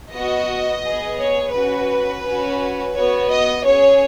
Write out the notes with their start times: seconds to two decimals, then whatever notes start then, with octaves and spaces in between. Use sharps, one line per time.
0.13 B3 F#4 D#5
0.84 B3 G#4
1.19 C#5
1.54 C#4 F#4 B4
2.25 C#4 F#4
2.95 B3 F#4 C#5
3.30 D#5
3.65 C#4 G#4 C#5